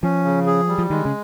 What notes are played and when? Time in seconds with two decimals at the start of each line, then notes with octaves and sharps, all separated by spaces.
0.03 F3 C#4
0.24 C#3
0.46 G#4
0.68 G3
0.78 F3
0.90 D#3 G#3
1.05 C#3